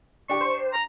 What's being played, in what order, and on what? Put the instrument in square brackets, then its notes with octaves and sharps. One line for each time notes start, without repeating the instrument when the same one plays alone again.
[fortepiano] D4 G4 [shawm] C#6
[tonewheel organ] C5
[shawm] A#5